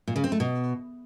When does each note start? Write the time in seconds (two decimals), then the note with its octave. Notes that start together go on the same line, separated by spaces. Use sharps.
0.08 A#2
0.16 C#3
0.24 C4
0.32 A3
0.40 B2